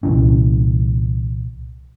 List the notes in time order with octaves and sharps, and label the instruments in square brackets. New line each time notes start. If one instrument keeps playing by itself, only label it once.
[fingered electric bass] C2 A#2 E3 C#4